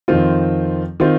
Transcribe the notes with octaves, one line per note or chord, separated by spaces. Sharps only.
F2 D#3 C4 F4
D#3 C4 F4